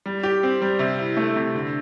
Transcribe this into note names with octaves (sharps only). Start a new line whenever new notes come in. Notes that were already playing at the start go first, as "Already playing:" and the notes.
G3
G4
C4
G3
C3
E4
A3
C3
D3